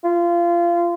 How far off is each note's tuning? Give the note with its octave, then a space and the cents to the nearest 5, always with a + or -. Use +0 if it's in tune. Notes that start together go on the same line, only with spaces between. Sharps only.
F4 -25